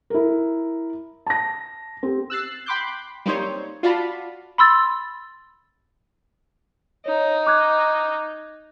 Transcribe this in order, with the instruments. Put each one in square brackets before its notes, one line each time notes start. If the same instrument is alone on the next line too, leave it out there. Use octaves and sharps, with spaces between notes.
[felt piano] E4 A#4
A5 A#6
C4 G4
[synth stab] E6 F#6 A6 C7
G5 B5 C6 D6 F#6 G6
G3 A#3 C4 D#4 C5 C#5
F4 F#4 D5 F5 A5 B5
[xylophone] B5 C6 E6 A6
[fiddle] D#4 [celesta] C#5
[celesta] D6 F#6 G#6